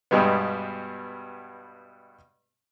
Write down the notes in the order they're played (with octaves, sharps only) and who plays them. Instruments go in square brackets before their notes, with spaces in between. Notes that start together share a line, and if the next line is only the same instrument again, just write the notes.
[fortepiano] G2 B2 G3 G#3 B3